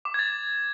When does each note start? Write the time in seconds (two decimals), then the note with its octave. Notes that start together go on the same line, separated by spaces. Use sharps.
0.05 D6
0.14 G#6
0.19 A6